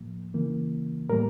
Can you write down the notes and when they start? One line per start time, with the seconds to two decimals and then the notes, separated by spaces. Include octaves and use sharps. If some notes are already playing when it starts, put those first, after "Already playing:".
Already playing: A2 F3 A#3
0.34 C#3 E3 A#3
1.10 A2 G3 A#3 A#4